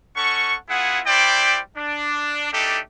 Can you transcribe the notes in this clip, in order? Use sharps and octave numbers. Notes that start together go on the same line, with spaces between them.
C#4 A4 F#5 C#6
B3 E4 F4 G#4 F#5
G3 E4 C5 D5 G5
D4
A3 D4 D#4 G4 A4